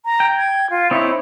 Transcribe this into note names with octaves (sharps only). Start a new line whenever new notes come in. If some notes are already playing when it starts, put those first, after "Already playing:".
A#5
G5
G#6
F4
C4 D#4 E4 C#5